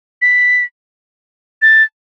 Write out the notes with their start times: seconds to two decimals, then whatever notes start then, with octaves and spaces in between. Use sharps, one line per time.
0.22 B6
1.62 A6